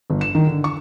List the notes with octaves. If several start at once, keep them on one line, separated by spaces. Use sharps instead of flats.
G1
E7
D#3
D3
C#6